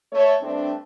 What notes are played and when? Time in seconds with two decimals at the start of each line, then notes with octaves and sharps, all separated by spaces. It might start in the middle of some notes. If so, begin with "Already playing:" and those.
0.13 A3 C#5
0.42 G2 A3 C4 D4